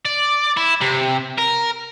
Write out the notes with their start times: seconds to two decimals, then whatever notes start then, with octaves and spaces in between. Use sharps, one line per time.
0.05 D5
0.57 E4
0.82 C3
1.38 A#4